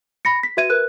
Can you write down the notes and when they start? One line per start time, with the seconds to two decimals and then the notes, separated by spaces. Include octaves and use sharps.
0.25 B5 A#6 C#7
0.43 B6
0.57 F#4 B4 E5 G#6 D#7
0.70 A#4 B4 F#6